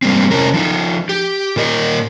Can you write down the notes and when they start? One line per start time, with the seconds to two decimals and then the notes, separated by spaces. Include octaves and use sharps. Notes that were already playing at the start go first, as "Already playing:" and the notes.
0.02 G3 A#3 C4
0.31 C3 C#4 A#4
0.54 F3 D#4
1.09 G4
1.56 A#2 A#4 D#5